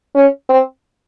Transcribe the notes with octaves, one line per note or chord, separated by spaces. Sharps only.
C#4
C4